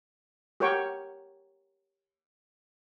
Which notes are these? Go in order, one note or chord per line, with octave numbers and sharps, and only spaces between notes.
F#4 G4 A#4 C#5 G5 C#6